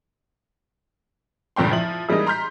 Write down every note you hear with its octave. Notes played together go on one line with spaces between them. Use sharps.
F1 C#2 G2 A#2 G5 C6
F3 E4 F#7
E3 G3 G#3 A#3 D#4
A#5 C6 F6 G6 B6